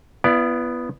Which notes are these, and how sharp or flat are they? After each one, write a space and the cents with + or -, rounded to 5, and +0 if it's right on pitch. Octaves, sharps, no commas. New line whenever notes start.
B3 +0 E4 +45 D5 +0